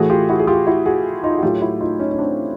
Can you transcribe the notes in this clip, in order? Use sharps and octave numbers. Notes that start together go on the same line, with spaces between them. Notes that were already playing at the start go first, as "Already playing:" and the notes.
Already playing: A2 E3 A3 F#4 G#4
F4 G4
E4 F#4
G#4
F4 G4
E4 F#4
F#4 G#4
D#4 F4
F#4
A2 F#3 A3 F4 G4
E4 F#4
D#4 F4
C#4 D#4
C#4
C4 D4